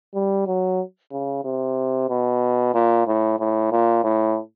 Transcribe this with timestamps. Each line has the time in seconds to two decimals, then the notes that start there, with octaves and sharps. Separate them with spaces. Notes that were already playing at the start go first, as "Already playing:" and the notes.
0.14 G3
0.47 F#3
1.12 C#3
1.44 C3
2.10 B2
2.74 A#2
3.07 A2
3.39 A2
3.72 A#2
4.04 A2